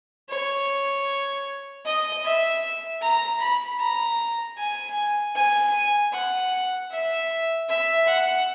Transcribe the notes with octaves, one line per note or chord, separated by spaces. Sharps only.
C#5
D#5
E5
A#5
B5
A#5
G#5
G#5
F#5
E5
E5
F#5